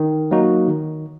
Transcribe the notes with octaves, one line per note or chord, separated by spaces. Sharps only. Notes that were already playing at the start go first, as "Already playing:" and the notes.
Already playing: D#3
F#3 A#3 D#4 F#4
D#3